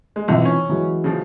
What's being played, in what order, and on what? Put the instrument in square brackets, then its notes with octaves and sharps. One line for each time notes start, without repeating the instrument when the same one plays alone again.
[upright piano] G#3
[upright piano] B1 E5 [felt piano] C3 E3 F3
[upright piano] C#4
[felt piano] E3 F#3 G#3
[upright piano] C#3 F3